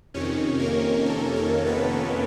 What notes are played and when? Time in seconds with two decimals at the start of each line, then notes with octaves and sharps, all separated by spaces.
0.14 F2 C3 D#3 C#4 C#5
0.59 A#3 A#4
1.06 A4
1.36 A#3 A#4
1.66 B3 B4